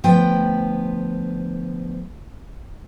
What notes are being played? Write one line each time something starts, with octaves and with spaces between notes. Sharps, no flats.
D2 F3 B3 G5